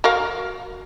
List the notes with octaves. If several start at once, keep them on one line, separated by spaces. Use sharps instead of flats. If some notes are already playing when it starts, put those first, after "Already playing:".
F#4 A#4 F5